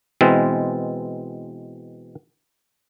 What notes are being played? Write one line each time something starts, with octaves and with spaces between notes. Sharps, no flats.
B2 E3 G#3 C4